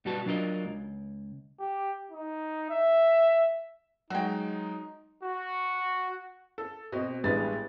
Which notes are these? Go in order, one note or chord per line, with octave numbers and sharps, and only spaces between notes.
B2 G3 B3 F#4 A5
F#3 D4 F4 A#4 D#5
C#2
G4
D#4
E5
F#3 G#3 D#4 F#4 G5
F#4
A4
B2 C4 D#5
A1 G3 G#3 B3 D4 A6